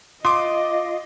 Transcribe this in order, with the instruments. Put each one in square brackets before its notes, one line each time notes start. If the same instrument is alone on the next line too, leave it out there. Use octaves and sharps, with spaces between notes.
[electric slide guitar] F4 [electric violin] D#5 [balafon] C6 [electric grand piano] D6 D#6